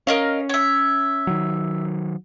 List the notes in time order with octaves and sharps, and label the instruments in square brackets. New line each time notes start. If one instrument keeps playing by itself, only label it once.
[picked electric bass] C#4 [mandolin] A#4 D#5 F5
[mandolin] C#5 E5
[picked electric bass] D#3 F#3